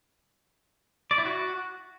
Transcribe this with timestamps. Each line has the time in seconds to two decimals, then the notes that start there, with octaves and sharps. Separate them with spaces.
1.11 D5
1.18 E4
1.25 F#4